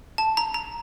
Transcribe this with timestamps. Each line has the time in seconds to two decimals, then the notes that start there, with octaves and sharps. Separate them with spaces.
0.18 A5
0.37 A#5
0.54 A#5